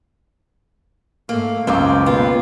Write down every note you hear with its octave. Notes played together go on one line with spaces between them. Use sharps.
G#2 A3 A#3
F#1 C#2 C#3 F#3 C4 D6
D#2 B2 B3 F4